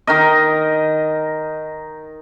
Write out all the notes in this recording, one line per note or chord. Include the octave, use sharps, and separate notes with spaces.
D#3 D#4 A#4 D#5